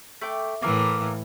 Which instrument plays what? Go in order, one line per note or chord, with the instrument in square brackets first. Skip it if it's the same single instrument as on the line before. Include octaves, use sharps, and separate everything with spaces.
[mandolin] A3 G5 D6
[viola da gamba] A2 E3 [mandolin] A#3 A#4